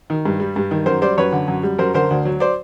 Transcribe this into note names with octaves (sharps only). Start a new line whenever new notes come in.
D#3
G2
G3
G2
D#3
F#2 A#4 C5
G3 C5 D5
F#2 B4 C#5
D3
F#2
G3
F#2 A#4 C5
D3 A#4 C5
D2
F#3
C5 D5